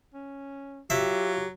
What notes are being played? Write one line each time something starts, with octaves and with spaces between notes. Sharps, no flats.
C#4
F#3 F4 G4 E5